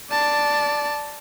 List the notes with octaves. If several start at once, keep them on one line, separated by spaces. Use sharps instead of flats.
D5 A5